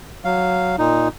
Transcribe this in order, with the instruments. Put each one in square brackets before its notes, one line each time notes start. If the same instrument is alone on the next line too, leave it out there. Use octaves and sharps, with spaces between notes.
[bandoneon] F#3 F5
A#2 D#4